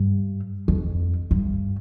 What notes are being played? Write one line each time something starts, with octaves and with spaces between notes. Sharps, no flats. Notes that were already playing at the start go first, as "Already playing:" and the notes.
Already playing: G2
F2
G2